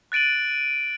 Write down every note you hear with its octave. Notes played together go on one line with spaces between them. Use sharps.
F#6 A6 D7 D#7 F#7